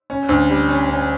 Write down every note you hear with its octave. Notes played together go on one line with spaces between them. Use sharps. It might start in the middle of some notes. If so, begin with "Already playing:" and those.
C#4
D2
G3
C#4
C#4